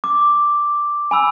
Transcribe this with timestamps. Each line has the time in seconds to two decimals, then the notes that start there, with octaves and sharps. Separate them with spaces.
0.04 D6
1.11 G#5 B5 E6